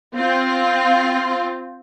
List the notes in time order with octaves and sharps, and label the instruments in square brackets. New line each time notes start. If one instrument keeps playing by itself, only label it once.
[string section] C4 F4